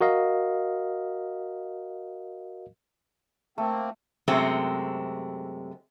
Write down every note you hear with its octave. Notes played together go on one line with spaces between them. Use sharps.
F#4 A#4 D#5 F5
A3 A#3 C4
F#2 C3 G#3 A3 C4 F#4